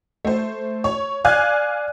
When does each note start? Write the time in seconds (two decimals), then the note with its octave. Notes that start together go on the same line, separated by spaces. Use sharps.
0.25 A3 C5
0.84 C#5
1.24 D5 F5 G#5 F#6 G#6